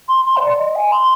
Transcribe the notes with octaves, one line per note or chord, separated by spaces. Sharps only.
C6
C6
C5
D5
D5
D#5
G#5
C6